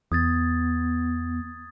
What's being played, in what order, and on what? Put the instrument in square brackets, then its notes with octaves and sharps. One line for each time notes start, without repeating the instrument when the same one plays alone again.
[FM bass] E2 [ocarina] B3 [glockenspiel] D#6 G#6 A6